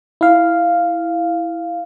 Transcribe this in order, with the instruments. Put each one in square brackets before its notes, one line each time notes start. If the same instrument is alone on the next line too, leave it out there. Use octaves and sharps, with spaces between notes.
[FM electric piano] E4 F5